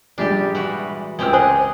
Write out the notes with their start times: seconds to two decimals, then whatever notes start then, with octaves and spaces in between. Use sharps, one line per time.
0.18 A#1 G3 G#3 D4 G4
0.55 E3 F#4
1.19 C#2 G#3 C4 G4 G5 E6
1.33 G#4 C5 D#5 G#5